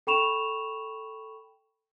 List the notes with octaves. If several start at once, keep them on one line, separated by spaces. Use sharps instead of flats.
A4 G5 B5 C#6 E7 F7